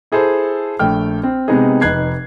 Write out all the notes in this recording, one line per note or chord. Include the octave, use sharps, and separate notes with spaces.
E4 G#4 A4 C5
A#1 A3 G5 F6
C4
C3 G#3 B3 C4 D#4 G#4
F1 D#4 B4 F#6 G#6 C7